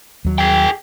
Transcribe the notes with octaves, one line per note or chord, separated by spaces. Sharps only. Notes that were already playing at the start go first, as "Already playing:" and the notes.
D#2 F#3
G#4 G5